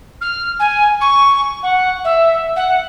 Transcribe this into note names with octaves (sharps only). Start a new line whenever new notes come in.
F6
G#5
C#6
F#5
E5
F#5